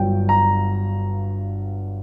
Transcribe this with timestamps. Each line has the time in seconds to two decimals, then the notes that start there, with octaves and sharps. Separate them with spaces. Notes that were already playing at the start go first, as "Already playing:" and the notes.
Already playing: G1 G2 D3 F#3 G5
0.29 A#5